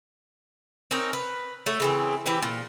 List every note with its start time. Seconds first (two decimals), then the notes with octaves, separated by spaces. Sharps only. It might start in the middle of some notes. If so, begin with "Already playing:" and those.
0.91 C4 C#4 D#4 A#4
1.13 B4
1.66 A3 F#4 C#5
1.80 C#3 E3 C4
2.26 E3 C4 G4 B4
2.42 A#2